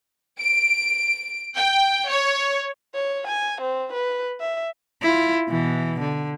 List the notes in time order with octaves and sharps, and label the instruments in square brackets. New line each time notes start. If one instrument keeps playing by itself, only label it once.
[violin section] D7
G5
C#5
[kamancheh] C#5
G#5
C4
B4
E5
[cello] E4 F4
B2 E3
D3